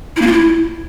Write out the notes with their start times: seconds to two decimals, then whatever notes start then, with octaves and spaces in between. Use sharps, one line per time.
0.16 E4
0.22 A#3
0.27 F4
0.32 E4